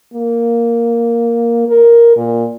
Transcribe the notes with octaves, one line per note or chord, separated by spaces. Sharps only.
A#3
A#4
A#2